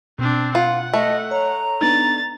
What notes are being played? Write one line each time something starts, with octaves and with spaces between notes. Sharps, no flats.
B2 C4 D4
F4 F#5
A3 D#5
C#5 A#5
B3 D4 D#4 A6